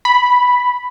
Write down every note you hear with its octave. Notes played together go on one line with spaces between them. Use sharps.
B5